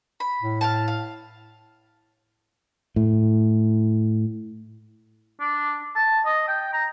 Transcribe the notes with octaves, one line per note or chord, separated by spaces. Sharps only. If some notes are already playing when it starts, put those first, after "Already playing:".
B5
A2
F5 G5 A5
F5
A2
D4
A5
D#5
G5
A#5